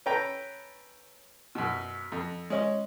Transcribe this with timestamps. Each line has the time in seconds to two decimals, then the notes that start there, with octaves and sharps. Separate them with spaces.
0.06 C#4 A4 B4 G5 A#5
1.55 F#2 B2
2.12 F2
2.50 G#3 C#4